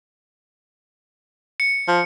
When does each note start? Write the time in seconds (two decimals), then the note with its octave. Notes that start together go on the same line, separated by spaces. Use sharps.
1.60 C#7
1.88 F3